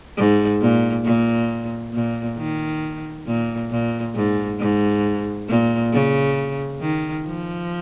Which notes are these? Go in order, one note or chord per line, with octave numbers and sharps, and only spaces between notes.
G#2
A#2
A#2
A#2
D#3
A#2
A#2
G#2
G#2
A#2
C#3
D#3
F3